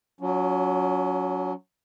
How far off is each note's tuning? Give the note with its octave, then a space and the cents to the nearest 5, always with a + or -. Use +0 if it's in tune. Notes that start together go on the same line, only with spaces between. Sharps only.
F#3 -5 C#4 +35 F4 +0